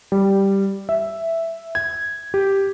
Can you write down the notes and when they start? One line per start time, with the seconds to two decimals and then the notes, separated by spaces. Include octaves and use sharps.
0.12 G3
0.89 E5
1.75 G#6
2.34 G4